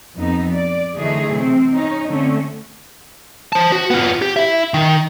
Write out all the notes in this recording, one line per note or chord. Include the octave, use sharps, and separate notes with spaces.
F2 B3 D#4
D5
D3 E3 F#3 A3 D#4 G#4
C3 C4
C#4 D#4
D3 A3 C4 C#4
C5 A5
F#4
B3 F4
G4
E4 E5
D#3